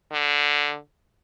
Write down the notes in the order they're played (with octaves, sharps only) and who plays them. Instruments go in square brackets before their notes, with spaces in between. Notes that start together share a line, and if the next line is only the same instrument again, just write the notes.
[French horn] D3